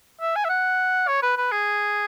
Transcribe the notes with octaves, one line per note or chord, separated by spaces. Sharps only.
E5
G#5
E5
F#5
C#5
B4
B4
G#4